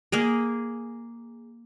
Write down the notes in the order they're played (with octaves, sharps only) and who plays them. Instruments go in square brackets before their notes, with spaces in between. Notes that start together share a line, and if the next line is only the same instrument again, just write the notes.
[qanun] A#3 G#4 A#4